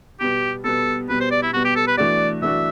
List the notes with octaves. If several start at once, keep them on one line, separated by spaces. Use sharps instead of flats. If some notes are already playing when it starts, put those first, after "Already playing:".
B2 G3 B3 G4
B2 G3 B3 A4
B2 G3 B3 B4
C5
D5
E4
B2 G3 B3 F#4
G4
A4
B4
E3 A3 D4 F#4 D5
E3 A3 D4 F#4 E5